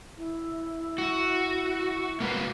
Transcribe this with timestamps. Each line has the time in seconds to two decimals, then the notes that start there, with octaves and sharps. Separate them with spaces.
0.17 E4
0.98 F#4
2.20 A#3 B3 F#4 B4